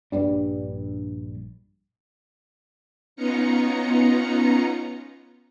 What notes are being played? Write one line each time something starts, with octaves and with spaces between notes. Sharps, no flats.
A#1 G2 G3 D4
B3 C#4 D#4 F4 A#5 C#7